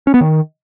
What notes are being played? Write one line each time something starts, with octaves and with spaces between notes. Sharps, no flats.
C#4
B3
D#3